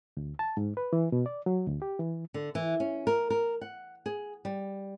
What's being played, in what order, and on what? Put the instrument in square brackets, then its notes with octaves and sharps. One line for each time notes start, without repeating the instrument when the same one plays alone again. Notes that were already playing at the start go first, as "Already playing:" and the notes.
[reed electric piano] D2
A5
G#2
B4
E3
B2
D5
F#3
D2
G4
E3
[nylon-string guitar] D3
E3
C#4
A#4
A#4
F#5
G#4
G3